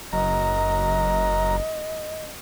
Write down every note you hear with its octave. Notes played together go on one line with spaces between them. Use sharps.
F#1 F#3 A#4 D#5 A#5